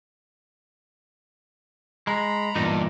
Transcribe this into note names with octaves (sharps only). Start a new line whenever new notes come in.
G#3 A#5 B5
E2 G2 A#2 D#4